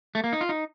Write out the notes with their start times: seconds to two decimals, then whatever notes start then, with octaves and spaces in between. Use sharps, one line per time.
0.15 A3
0.24 A#3
0.33 D#4
0.41 F4
0.49 D#4